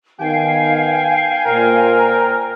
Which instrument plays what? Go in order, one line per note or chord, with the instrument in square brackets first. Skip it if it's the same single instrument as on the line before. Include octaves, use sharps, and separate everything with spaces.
[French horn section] D#3 B3 [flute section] F5 [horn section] G5 G#5
[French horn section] A#2 C5 [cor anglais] A#4